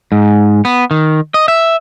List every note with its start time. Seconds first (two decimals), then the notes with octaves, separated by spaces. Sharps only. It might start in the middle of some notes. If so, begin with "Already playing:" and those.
0.12 G#2
0.65 B3
0.91 D#3
1.34 D#5
1.48 E5